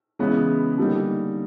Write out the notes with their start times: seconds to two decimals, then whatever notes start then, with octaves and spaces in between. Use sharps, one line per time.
0.19 C#3 E3 G#3 B3
0.78 D3 G3 A#3 D#4